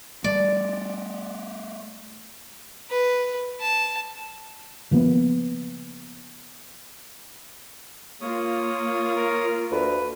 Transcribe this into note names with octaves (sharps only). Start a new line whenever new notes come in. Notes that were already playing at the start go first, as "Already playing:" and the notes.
G3 A3 D5
B4
A5
C#3 F3 A#3 B3
A#3 F4 C#5 D#6
A#4
D2 B4